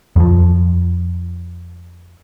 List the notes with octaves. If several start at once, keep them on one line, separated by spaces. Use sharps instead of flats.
F2 F3